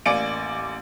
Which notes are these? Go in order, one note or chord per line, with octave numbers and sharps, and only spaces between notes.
A1 A#3 D5 G#5 D7